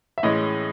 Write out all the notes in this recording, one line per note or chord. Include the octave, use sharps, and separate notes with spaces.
E5
A2 E3 G#3 C#4 D#5